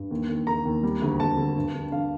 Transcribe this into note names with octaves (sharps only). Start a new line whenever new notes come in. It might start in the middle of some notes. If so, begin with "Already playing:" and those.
Already playing: G2
D#2
D#2
D#3 A#5
D#2
G3
D2
D2 A5
D3
G2
D3
D3 F5